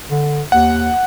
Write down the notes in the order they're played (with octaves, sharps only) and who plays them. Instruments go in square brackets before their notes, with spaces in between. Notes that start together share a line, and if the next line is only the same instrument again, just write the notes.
[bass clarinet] D3
[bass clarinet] D#2 [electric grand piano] F#5